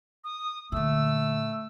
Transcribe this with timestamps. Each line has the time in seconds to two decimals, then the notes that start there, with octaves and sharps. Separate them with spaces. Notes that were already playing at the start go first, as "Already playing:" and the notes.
0.24 D#6
0.72 A#2 D3 A3 E6